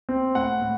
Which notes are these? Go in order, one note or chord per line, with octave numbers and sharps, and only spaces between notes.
C4
A2 F#5
A2